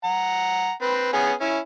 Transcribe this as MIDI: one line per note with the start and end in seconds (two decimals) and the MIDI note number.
0.04 0.72 78
0.04 0.72 82
0.82 1.08 60
0.82 1.08 71
1.13 1.32 59
1.13 1.32 61
1.13 1.32 68
1.41 1.58 61
1.41 1.58 64